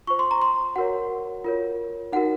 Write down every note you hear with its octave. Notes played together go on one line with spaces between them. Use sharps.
F4 C5 C#6
C6
A#5
C6
F#4 A#4 C#5 F#5
F4 A#4 C#5
D#4 F#4 A#4 F#5